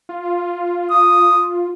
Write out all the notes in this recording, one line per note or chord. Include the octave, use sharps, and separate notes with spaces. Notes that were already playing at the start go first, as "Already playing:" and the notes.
F4
D#6